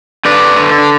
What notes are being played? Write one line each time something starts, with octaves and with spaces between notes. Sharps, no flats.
D3 B4 D5
D3
D4